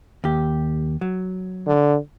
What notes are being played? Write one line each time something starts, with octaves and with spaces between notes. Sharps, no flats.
D#2 G4
F#3
D3